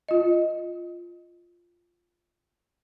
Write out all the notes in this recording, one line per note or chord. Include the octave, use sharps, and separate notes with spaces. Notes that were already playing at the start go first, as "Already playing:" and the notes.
F4 D#5